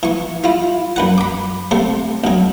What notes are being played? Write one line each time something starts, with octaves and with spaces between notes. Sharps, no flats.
E3 C#6
E4 F4
F#2 B4 F#5
B5 D6
C3 A3 C4
D2 F#3